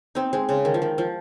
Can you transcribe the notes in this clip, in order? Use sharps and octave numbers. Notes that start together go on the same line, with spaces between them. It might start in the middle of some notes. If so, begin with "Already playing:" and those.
C4 D#4
G#3 C4
C#3
D#3
F3
D#3
F3